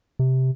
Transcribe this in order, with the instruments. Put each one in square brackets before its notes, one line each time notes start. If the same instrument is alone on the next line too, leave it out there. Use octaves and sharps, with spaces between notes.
[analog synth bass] C3